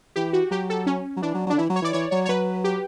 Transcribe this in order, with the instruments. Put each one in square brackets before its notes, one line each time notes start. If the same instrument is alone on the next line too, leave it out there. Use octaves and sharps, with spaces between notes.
[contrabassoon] E3 [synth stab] G4
[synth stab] F#4
[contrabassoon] F#3 [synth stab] G4
[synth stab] A4
C#4
[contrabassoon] F#3
[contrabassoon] E3 [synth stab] D4
[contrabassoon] F#3
F#3
[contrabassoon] D3 [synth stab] D4
[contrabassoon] E3 [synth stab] E4
[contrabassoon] F#3
[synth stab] C#5
[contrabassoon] E3 [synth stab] D5
[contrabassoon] E3 [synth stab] C#5
[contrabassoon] F#3 [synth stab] C#5
[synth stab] C#5
[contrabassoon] F#3 [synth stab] B4
[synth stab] G4